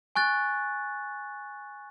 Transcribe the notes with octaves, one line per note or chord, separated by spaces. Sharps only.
G#5 C#6 F#6 A6